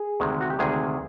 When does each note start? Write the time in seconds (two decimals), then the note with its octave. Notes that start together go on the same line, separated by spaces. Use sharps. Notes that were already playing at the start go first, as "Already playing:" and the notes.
Already playing: G#4
0.20 D2 C3 D#3 G#3
0.41 F#4
0.50 G4
0.59 D2 C3 D#3 G#3 G#4